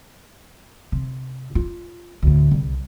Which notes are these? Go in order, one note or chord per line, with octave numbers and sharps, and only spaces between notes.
C3
F4
D2 A2
C2